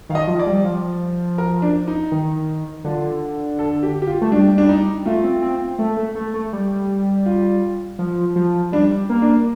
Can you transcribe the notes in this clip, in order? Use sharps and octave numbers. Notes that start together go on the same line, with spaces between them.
D#3 F5
D#5
F3
D5
G3
F3
A#4
D4
D#4
D#3
D3 F4
A4
G4
G4
F4
A3
G3 D4
D4
D#4
A3 F4
C4
C4
A3
A3
A3
A3
G3
F4
F3
F3
G3 D4
A#3
D4